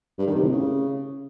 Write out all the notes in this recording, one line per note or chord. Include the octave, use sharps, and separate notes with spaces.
G2
D#3
C3
A2
C#3